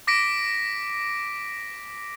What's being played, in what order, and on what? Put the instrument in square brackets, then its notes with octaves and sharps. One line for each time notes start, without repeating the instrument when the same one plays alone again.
[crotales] D6 A#6 B6 D7